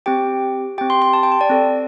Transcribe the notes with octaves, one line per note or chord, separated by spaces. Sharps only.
C4 G4 G5
C4 G4 G5
C6
C6
A5
G5
A5
D5
C4 A4